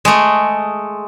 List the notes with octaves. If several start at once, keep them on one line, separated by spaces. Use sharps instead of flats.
G#3 A3